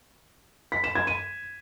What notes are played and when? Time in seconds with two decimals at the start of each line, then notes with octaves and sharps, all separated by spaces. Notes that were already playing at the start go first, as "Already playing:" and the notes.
0.72 B6
0.84 E7
0.95 G#6
1.07 D#7